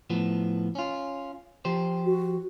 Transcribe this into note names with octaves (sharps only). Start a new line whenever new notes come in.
A2 F3 B3
C#4 F4
F3 G4 C5
F#4